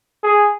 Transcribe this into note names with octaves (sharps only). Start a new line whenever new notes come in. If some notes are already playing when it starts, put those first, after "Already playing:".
G#4